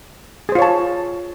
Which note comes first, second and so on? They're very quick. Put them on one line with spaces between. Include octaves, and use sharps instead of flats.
G#4 C5 F4 C#5 A5